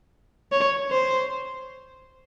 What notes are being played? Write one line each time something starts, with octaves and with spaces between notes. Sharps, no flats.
C#5
C5